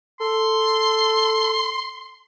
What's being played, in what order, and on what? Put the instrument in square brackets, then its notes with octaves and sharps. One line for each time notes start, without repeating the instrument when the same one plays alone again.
[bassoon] A4 [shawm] C6